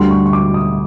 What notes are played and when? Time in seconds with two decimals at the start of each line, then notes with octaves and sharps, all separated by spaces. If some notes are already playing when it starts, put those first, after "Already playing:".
Already playing: D2 D3 G3 C6
0.11 C#6
0.26 C#6
0.33 D6
0.54 D#6